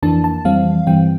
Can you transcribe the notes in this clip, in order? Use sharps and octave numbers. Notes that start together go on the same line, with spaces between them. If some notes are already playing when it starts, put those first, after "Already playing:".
F2 E3 A#3 D4 A5
A5
F2 E3 G3 C4 F5
G2 E3 G3 C4 G5